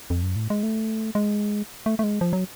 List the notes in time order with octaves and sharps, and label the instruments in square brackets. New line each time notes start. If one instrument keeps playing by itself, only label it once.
[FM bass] F2
F#2
A2
G#3
A3
G#3
A3
A3
G#3
F3
F#3